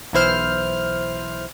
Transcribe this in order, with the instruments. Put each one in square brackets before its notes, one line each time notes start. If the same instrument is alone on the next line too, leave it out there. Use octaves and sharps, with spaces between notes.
[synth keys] B1 E3 E4 C5 F6